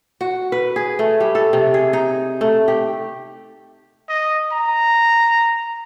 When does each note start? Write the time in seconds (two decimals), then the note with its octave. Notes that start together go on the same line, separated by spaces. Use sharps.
0.21 F#4
0.52 B4
0.76 G#4
0.99 A3
1.20 G3
1.35 A4
1.53 C3
1.74 G#4
1.93 D#4
2.41 A3
2.68 G4
4.09 D#5
4.52 A#5